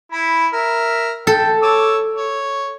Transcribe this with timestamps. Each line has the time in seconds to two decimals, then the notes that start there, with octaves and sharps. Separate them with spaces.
0.12 E4 B5
0.53 A#4 E5
1.27 A4 G5
1.62 C#5 D6 E6
2.16 C#5